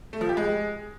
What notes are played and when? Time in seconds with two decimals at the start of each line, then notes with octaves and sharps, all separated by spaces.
0.13 A3
0.21 F3
0.29 G4
0.37 G#3